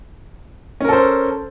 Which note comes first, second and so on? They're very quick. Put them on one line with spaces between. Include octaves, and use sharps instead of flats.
C#4 A#4 A4 C5